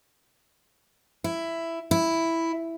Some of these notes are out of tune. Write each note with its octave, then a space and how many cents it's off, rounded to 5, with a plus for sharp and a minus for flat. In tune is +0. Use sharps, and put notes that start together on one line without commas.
E4 +10
E4 +0